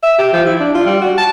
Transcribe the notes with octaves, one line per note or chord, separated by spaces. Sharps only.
E5
G4
F3
E4
D4
F4
G3
F#4
A5